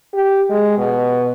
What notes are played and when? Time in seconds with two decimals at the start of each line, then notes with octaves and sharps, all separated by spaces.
0.14 G4
0.50 G#3
0.78 B2